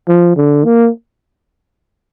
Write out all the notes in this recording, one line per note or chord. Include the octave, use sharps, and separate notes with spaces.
F3
D3
A#3